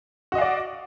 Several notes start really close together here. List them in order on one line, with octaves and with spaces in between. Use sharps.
F#4 D#5 F5 D5